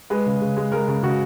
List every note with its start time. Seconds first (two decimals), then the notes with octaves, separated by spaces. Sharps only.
0.10 G#3 B4
0.26 C#3
0.41 C#3
0.57 G#3
0.72 G#3 A#4
0.88 C#3
1.03 C#3 F#4